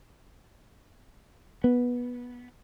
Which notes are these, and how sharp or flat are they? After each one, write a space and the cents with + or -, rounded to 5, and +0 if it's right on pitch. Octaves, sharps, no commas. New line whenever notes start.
B3 -15